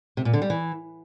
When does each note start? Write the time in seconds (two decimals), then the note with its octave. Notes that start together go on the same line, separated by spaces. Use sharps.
0.17 C3
0.25 A#2
0.33 D3
0.42 G3
0.50 E3